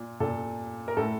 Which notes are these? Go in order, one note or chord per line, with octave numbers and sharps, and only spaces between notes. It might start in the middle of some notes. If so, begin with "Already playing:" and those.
Already playing: A#2
A#2 A4
A#4
A2 A4